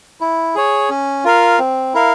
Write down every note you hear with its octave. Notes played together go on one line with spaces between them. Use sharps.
E4
G#4 C#5
C#4
F4 A#4 F5
C4
E4 A#4 F5